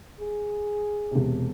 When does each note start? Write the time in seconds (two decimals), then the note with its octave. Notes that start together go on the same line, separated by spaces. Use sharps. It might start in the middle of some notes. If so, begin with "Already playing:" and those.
0.19 G#4
1.11 E1 C3